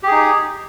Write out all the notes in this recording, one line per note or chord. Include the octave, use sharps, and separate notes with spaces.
D#4 G4 G#4